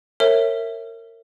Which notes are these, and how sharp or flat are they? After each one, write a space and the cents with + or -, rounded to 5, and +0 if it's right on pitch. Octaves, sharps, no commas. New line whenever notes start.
A#4 -30 C#5 -30 E5 +0